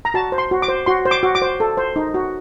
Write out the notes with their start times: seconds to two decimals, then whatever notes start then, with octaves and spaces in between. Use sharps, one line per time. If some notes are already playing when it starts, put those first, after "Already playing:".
0.05 A#5
0.14 F#4 A5
0.32 C5
0.38 C6
0.51 F#4
0.62 D6
0.68 C5
0.86 F#4 C6
1.05 C5
1.11 D6
1.23 F#4
1.35 D6
1.42 C5
1.60 A4
1.77 C5
1.96 D#4
2.14 F#4